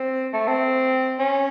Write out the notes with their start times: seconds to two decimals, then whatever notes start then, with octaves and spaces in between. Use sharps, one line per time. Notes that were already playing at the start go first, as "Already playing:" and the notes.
Already playing: C4
0.34 A3
0.48 C4
1.19 C#4